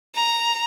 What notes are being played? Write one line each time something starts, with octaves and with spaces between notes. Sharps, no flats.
A#5